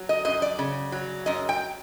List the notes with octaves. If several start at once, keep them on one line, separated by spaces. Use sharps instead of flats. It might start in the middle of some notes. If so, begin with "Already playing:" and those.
Already playing: F#3
D#5
F#2 D#5
D5
C#3
F#3
F#2 D#5
G5